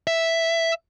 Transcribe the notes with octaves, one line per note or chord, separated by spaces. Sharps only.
E5